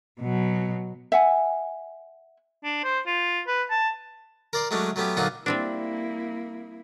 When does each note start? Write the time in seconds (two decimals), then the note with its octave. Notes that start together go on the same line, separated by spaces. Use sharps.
0.20 B2 F#3
1.12 E5 F#5 G#5
2.64 D4
2.84 C5
3.07 F4
3.47 B4
3.71 A5
4.53 A#4 D5 C6
4.71 F#3 G#3 A3 C#4 D4
4.96 F#3 A3 B3 C#4 G4
5.17 A#2 D3 F#3 D#4 F4 F#4
5.46 G3 A#3 C4 D4 E4